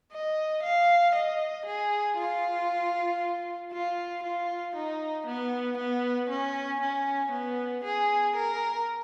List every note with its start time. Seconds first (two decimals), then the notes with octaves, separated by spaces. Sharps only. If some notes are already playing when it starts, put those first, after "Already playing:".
0.12 D#5
0.63 F5
1.15 D#5
1.66 G#4
2.17 F4
3.72 F4
4.23 F4
4.75 D#4
5.27 B3
5.77 B3
6.30 C#4
6.81 C#4
7.32 B3
7.84 G#4
8.36 A#4